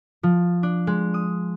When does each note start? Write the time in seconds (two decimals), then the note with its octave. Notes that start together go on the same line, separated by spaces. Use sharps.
0.23 F3
0.63 D4
0.87 G#3
1.14 D#6